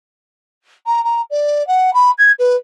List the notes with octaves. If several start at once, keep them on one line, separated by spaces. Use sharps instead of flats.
A#5
A#5
D5
F#5
B5
G#6
B4